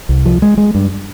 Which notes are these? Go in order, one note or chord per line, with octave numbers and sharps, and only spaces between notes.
C2
F3
G#3
G#3
G2